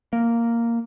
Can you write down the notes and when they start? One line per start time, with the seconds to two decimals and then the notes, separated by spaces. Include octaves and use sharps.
0.13 A#3